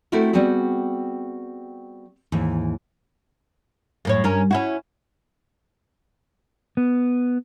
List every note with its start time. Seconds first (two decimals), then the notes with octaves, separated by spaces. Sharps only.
0.12 A3 C4 E4 F#4 A4 A#4
0.33 G3 B3 C4 F#4 G#4
2.32 D#2 G#2 E3
4.05 F#2 A2 C#5
4.24 G2 C#4 A#4
4.51 C#4 E4 F#4
6.77 B3